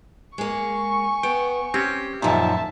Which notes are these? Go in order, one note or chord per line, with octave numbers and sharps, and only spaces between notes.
G#3 A#3 G#5 C#6
B3 G5
C4 C#4 G4
F#2 A#2 D#3 F3 E5 A5